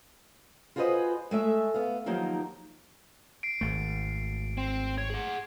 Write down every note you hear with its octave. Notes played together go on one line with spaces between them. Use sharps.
F4 F#4 G#4 B4 C5 D#5
G#3 A3 E5
B3 F5
D#3 F3 F#3 A#3 D#4 G4
C7 D7
G#1 A3
C4
C#5 G#6
G#4 F#5